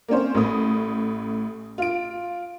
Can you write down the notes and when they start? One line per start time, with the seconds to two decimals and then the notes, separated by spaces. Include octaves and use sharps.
0.08 A#3 C4 C#4 C5
0.35 A1 A2 D#6
1.78 F4 D7